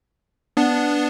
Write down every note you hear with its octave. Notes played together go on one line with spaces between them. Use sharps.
B3 D4